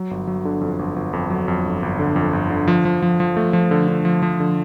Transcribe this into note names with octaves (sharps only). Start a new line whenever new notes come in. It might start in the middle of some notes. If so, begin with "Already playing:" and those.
Already playing: F#3
G1
F#3
D3
F2
G1
G1
F2
F#3
F2
G1
G1
D3
F2
G1
D3
F3
F3
F3
F3
A3
F3
D3
D3
F3
F3
D3